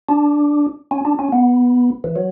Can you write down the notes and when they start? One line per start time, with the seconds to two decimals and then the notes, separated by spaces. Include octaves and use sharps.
0.09 D4
0.91 C#4
1.05 D4
1.19 C#4
1.32 B3
2.04 E3
2.16 F#3